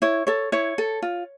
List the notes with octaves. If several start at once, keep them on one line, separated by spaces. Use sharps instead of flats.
E4 C#5
A4 C#5
E4 C#5
A4
F4